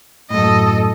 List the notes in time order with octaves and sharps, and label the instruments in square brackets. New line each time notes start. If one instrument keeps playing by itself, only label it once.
[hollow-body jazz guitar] F#2 A2 [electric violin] A4 D#5